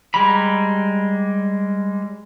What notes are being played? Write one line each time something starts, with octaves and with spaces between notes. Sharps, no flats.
G3 G#3 A#5 B5